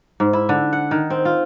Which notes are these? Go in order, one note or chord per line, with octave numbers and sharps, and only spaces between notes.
G#2
E4
D3
F#5
D#3
C4
F4